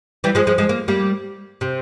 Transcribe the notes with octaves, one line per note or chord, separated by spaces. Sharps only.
E3 G3
F3 G#3
F3 G#3
F3 G#3
A#3
G3 A#3
C3